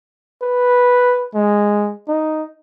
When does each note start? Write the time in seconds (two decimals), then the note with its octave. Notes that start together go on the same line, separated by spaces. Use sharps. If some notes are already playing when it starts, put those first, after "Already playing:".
0.42 B4
1.34 G#3
2.08 D#4